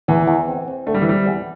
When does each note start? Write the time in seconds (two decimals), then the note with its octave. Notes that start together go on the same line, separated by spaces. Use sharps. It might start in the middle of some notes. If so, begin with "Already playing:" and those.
0.08 E2 E3
0.27 E2
0.48 C4
0.68 C4
0.87 D3 A3
0.94 G3
1.02 E3
1.07 G3 C4
1.26 E2